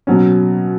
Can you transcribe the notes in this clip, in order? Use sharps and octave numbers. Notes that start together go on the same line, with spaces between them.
B2 F#3 C#4